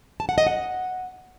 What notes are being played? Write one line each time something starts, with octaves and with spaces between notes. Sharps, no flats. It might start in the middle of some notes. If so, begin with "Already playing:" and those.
A5
F#5
D#5
F#5